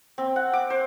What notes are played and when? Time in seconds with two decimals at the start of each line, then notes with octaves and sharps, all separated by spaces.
0.18 C4
0.36 F#5
0.53 D6
0.70 C5